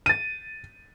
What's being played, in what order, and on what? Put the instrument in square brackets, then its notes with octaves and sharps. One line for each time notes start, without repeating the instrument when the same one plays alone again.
[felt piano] A6 D#7